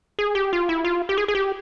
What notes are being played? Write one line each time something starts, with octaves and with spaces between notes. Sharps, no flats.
G#4
G4
F4
E4
F4
G4
G#4
G#4
G4